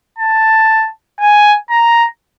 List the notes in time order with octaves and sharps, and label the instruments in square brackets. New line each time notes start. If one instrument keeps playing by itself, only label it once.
[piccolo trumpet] A5
G#5
A#5